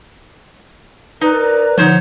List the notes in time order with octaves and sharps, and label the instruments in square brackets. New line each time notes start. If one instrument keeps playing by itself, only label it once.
[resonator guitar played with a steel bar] D#4 [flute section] A#4 D5 A#5 [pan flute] B4
[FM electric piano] D3 F3 [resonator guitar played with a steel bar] D#4 C5 C#5 [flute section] F#5 G6